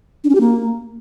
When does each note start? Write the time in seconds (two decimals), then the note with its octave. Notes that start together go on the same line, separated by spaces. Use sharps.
0.24 D4
0.30 C#4
0.35 G4
0.41 A#3